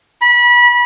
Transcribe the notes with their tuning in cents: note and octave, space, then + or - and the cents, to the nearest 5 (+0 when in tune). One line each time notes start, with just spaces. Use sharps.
B5 -25